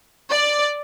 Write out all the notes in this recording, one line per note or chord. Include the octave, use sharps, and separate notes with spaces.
D5